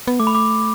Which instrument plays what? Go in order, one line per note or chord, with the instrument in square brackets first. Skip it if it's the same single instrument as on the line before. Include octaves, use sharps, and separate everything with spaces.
[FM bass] B3
[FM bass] A3 [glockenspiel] D6
[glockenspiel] B5
D6